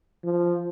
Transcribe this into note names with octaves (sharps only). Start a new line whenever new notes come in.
F3